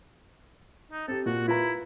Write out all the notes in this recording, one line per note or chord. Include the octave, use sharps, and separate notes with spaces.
D#4
C4 G4 A4
A#2 F#4
E4 F4 B4 A#5